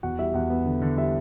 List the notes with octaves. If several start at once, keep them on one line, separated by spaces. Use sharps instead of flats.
E2 F#4 F#5
G3 E4 E5
E2 F#4 F#5
B3
D3
D3
G3 E4 E5